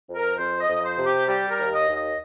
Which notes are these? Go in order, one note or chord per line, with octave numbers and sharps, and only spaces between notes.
F2
A#4
F2 C5
D#5
F2
C5
C3
G4
G3 G4
A#4
D#2
D#5
D#2
D#5